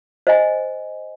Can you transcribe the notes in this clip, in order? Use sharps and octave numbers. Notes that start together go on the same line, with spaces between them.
C5 D#5 G#5